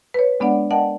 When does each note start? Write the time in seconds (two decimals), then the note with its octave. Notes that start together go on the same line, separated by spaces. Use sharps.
0.14 B4 C#5
0.40 G#3 B3 D4 D5 F#5
0.70 A#4 D5 D#5 F#5 G5 A5